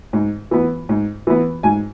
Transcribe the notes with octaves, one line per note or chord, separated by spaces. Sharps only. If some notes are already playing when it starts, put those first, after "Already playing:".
G#2
E3 B3
G#2
E3 B3
G#2 G#5